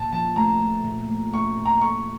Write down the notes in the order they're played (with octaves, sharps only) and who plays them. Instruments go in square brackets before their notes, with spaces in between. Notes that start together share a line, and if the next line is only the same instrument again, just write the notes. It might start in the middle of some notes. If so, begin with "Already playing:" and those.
Already playing: [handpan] A#2 [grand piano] A5
[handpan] F3 [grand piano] A5
[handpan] A3 [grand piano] A#5
[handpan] A3
A#2
A3
[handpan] A3 [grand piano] C#6
[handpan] A#2
[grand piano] A#5
[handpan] A4 [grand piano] C#6